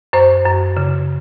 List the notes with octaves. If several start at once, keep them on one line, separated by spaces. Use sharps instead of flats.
F#2 C5
F#2
C#3